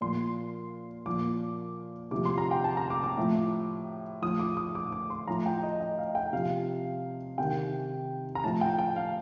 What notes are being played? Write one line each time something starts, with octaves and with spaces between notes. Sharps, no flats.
A#2 F3 C6
A#2 F3 D6
C3 F3 D6
C6
A#5
G5
A5
A#5
D6
D6
A2 F3
A2 F3 D#6
D6
D#6
D6
D6
C6
A2 F3 A#5
G5
D#5
D#5
F5
G5
C3 F3 F5
C3 D#3 G5
A#5
A2 F3 A5
G5
G5
F5